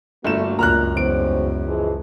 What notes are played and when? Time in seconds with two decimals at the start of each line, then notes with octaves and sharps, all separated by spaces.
0.24 G1 A3 A#3 D4 F#4 E7
0.59 C#2 F#2 A#2 A#5 F6 F#6
0.97 E2 G3 F#4 C5 D7
1.66 E3 F3 G#3